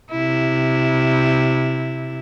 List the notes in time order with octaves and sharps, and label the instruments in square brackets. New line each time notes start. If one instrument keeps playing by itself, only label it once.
[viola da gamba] C3 E4